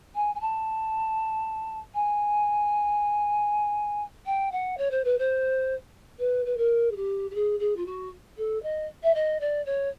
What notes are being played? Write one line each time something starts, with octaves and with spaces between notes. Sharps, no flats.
G#5
G#5
A5
G#5
G5
F#5
C#5
C5
B4
C5
B4
B4
A#4
G#4
G4
G4
G#4
G#4
F4
F#4
A4
D#5
E5
D#5
D5
C#5